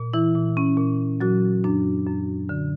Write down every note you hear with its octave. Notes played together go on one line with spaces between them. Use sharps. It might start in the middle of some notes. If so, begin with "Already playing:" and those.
Already playing: A#2
E3 E4
A#2
C#4
A#2
A#2 F#3 F#4
F#2 D4
F#2
D3